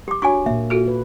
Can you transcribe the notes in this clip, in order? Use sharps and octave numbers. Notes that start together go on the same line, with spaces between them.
G4 D6
D4 F#4 C#5 G#5 C#6
A#2 A#3 E5
F4 F#4 A4
B4